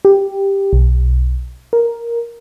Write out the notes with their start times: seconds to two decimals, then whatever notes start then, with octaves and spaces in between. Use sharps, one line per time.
0.05 G4
0.73 B1
1.73 A#4